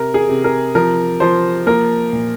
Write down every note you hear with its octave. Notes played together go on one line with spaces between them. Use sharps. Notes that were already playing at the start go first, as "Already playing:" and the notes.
Already playing: C3 A#4
G#4
C3
A#4
F3 A#4
F3 C5
A#3 A#4
A#2